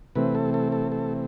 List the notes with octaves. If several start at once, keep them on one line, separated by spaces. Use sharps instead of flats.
C3 E3 A3 C4 B4
A4
A4
A4
A4